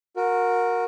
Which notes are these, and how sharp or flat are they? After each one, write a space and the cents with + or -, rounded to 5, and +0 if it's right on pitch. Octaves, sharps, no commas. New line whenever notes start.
F#4 -25 A#4 +0